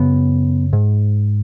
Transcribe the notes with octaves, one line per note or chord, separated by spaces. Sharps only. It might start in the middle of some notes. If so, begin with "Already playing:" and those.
Already playing: F#2 C#3 B3
G#2